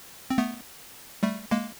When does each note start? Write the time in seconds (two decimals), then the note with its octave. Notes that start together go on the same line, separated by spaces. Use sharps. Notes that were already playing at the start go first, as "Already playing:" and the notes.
0.30 C4
0.38 A3 B3
1.23 G3 A3
1.51 G#3 A#3